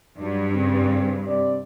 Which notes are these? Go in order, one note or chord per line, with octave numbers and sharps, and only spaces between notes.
G2 F#3 D4
C#3 C4
C3 C4 D5